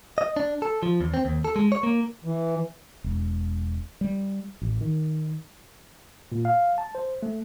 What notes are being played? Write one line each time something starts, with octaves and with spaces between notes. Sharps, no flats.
D#5
D4
A4
F3
E2
C4
D#2
A4
G#3
C#5
A#3
E3
E1
G3
A1
D#3
A#2
F5
A5
C5
A3